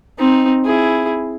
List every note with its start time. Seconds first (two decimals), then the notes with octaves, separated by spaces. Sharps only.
0.19 C4 D#4
0.64 E4 G#4